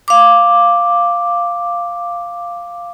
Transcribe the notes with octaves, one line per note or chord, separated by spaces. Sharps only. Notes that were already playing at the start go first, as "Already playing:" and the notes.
F5 D6